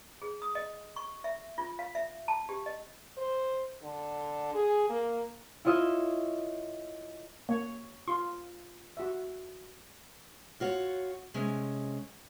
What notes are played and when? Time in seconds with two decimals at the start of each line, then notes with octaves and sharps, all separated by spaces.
0.22 G#4
0.42 D#6
0.55 D#5
0.96 C#6
1.24 E5
1.58 F4
1.79 F5
1.95 E5
2.28 A5
2.49 G4
2.66 D#5
3.17 C5
3.82 D3
4.54 G#4
4.89 A#3
5.65 E4 F4 C#5 D#5 E5
7.49 A#3 C#5
8.08 F4 C6
8.97 F#4 E5
10.60 F4 F#4 C#5
11.34 C3 G#3 C#4